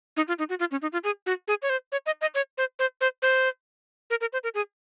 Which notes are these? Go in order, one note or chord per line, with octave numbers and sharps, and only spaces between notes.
D#4
F4
D#4
F#4
F4
C#4
D#4
F4
G#4
F#4
G#4
C#5
C5
C#5
D#5
D#5
C#5
C5
C5
C5
C5
A#4
A#4
C5
A#4
G#4